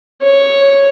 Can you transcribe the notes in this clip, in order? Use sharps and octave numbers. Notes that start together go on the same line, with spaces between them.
C#5